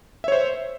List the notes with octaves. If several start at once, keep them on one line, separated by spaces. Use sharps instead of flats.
C5 C#5 E5